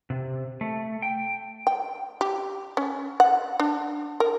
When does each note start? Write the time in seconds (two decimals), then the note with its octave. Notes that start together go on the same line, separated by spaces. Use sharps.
0.10 C3
0.61 A3
1.02 G5
1.67 G5
2.21 G4
2.77 C#4
3.20 F#5
3.60 D4
4.20 A#4